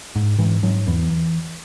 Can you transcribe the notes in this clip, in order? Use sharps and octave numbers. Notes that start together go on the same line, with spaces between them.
G#2
G#2 E3
G#2 F#3
E2 E3